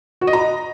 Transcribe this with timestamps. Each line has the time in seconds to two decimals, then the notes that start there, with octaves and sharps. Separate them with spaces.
0.21 F#4
0.27 D#5
0.33 A#5